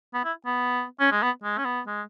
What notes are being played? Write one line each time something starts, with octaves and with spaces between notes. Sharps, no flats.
B3
E4
B3
C#4
G#3
B3
G#3
C#4
B3
G#3